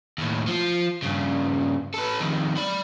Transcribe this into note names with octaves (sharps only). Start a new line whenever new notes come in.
D#2 A2
F3 F4
G2 C#3
A4 B4
F2 D#3
D5 B5